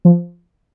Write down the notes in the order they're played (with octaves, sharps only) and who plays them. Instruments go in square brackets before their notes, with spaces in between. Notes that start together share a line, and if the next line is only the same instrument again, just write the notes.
[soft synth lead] F3